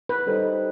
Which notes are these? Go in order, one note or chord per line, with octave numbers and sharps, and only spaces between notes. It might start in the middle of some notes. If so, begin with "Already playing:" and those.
B4
G3 D#4 A4 C5 D#5